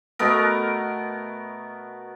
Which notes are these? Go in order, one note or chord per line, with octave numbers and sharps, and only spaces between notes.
B2 A3 B3 A#4